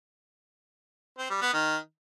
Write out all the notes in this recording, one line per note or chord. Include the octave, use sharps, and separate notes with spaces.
C4
G3
B3
D#3